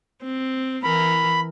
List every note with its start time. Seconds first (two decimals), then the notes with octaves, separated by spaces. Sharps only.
0.23 C4
0.83 E3 A#4 B5